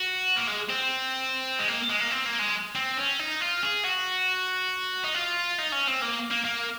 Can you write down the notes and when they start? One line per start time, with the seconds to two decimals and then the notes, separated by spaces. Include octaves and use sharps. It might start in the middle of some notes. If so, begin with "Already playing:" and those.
Already playing: F#4
0.37 A#3
0.48 G#3
0.70 C4
1.59 G#3
1.68 A#3
1.90 G#3
2.00 A#3
2.11 C4
2.26 A#3
2.39 G#3
2.75 C4
2.98 C#4
3.20 D#4
3.41 F4
3.63 G#4
3.84 F#4
5.04 D#4
5.14 F4
5.58 D#4
5.72 C#4
5.87 C4
6.02 A#3
6.31 A#3
6.45 A#3